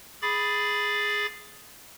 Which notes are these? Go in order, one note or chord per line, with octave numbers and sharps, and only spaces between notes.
G#4 B5 D6 A6